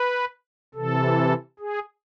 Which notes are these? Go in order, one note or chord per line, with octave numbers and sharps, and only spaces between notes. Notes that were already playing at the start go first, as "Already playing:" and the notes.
Already playing: B4
C3 E3 A4
G#4